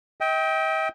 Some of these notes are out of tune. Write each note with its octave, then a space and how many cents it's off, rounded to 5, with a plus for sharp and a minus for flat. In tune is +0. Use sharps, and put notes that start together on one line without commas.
D#5 +45 G5 +0